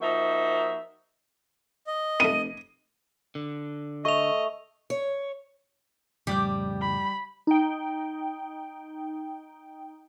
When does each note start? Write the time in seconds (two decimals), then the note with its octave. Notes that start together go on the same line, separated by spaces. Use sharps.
0.01 F3 A#3 D#4 F#4 C5 E5
1.87 D#5
2.20 F1 A3 B3 D#7
3.35 D3
4.05 A3 D#5 C#6 F7
4.90 C#5
6.27 F2 A2 C#3 G3 G4 D6 G6
6.81 B5
7.47 D#4 G5